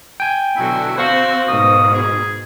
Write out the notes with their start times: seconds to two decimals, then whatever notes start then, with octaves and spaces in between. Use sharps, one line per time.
0.20 G5 G#5
0.56 B2 D3 F#3 E4
0.98 C4 F#4 C5 F5 C#6
1.48 G#2 B2 D#3 D#6
1.95 G#4